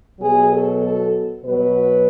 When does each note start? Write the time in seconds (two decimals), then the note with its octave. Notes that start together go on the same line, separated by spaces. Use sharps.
0.20 B2 F#3 G#4
0.52 A4
0.82 A4
1.44 B2 F#3 B4